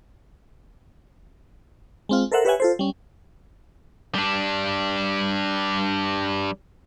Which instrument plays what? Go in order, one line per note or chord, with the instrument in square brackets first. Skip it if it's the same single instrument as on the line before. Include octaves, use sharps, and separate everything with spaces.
[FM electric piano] G#3 C4 F4
A4 A#4 C5 E5 F#5
G4 B4 C#5 E5 F#5 G#5
F4 A4 C5
G3 C#4
[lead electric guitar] G3 D4